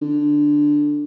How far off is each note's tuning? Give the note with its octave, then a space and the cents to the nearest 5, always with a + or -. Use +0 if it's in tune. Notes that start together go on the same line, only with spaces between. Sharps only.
D3 +5